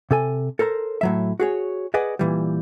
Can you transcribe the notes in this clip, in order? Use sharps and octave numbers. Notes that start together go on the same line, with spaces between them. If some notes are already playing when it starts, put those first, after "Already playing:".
C3 A4 G#5
A4 A#4 C5 A#5
A2 F#3 E5
F#4 G#4 C#5
G#4 B4 D5 D#5 F#5 G#5
A#2 E3 G3